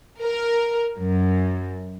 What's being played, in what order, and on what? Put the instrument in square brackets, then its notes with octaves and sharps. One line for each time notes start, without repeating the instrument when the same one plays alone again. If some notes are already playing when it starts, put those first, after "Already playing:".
[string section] A#4
F#2